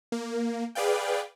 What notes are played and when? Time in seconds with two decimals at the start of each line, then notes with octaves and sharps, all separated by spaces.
0.12 A#3
0.75 G#4 B4 D5 F5 G5